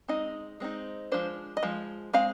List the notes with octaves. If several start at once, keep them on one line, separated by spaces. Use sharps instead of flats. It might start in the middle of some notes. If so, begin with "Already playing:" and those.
G#3 C4 D#4 D#5
G#3 C4 D#4
F3 G#3 D4 C5
D#5
F3 G#3
G#3 C4 F5